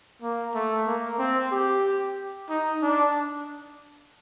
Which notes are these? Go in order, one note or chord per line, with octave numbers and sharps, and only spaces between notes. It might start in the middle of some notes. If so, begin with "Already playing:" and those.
A#3
A3
A#3
C4
G4
D#4
D4